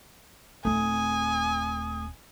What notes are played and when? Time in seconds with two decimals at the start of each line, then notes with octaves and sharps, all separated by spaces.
0.65 D#1 A3 C4 G#5 D#6